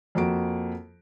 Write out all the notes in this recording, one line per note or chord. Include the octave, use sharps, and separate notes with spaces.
F2 A#3 F#4 D7